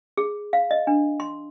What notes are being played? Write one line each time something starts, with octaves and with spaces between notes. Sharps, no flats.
G#4
F5
D#5
D4
C6